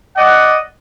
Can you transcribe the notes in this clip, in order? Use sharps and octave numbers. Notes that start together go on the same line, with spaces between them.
D5 D#5 F#5